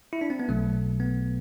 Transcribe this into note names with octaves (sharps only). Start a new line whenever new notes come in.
E4
D4
C4
B3
B1 B2 F#3 A3
B3